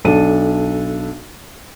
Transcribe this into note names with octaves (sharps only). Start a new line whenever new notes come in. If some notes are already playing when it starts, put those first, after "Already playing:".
B1 D4 A4 D#7